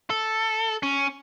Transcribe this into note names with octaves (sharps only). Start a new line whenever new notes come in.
A4
C#4